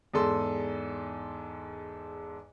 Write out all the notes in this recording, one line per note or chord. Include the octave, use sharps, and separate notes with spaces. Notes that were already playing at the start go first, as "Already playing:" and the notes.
E2 G#2 A4 C6